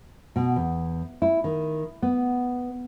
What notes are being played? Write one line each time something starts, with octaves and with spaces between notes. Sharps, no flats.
B2
E2
E4
D#3
B3